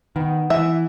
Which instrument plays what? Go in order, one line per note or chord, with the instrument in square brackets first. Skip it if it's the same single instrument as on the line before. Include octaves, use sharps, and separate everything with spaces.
[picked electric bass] D#3 [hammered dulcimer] B3
[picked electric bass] E3 [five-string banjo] E5